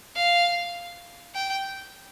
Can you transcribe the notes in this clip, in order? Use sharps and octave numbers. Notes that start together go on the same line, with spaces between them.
F5
G5